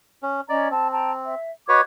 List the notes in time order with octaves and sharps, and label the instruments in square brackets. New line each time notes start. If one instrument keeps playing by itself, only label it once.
[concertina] C#4
[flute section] C#4 D#5 A#5 [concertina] D5
[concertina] C4 [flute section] A5
[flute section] G5 A5 A#5
E5
[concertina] F#4 B4 C#5 [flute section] D#5 D6 G#6